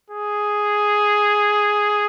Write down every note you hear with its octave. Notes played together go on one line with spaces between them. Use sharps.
G#4